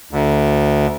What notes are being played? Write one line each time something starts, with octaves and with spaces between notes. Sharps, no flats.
D2